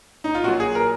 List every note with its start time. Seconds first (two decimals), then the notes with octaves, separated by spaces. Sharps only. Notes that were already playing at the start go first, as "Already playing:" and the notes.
0.24 D#4
0.35 F4
0.44 A#2 F#3 F#4
0.60 G#4
0.75 A#4